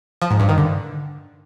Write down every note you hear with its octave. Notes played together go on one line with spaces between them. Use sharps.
F3
G#2
G2
D#3
D3